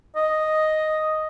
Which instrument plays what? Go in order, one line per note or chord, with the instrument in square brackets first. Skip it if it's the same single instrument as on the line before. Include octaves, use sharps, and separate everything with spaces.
[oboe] D#5